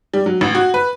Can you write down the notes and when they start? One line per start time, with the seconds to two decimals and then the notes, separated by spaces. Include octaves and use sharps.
0.14 G3
0.26 F#3
0.41 A1
0.55 F#4
0.74 B4